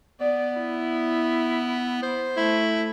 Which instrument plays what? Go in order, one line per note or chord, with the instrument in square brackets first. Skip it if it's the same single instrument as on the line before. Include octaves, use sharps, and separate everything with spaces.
[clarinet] B3 [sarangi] D5
[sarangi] E4
[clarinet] C5
[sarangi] A3 [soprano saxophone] E4